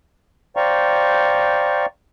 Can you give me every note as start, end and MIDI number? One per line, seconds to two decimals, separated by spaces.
0.57 1.86 72
0.57 1.86 74
0.57 1.86 77
0.57 1.86 79
0.57 1.86 82
0.57 1.86 85